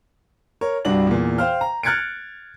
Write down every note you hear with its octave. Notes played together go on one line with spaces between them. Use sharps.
A#4 C#5
C2 G2 D4 F#4 D5 F#7
E2 A#2
C5 F5 G5 F6
A#5
F6 F#6 G#6 A6 C#7 D7